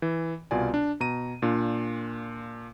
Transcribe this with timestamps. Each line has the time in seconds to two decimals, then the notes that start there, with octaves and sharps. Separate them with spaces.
0.02 E3
0.51 C2 B2 F4 D5 G#5
0.74 D4
1.00 B2 A#5 D#7
1.42 A#2 D4 F4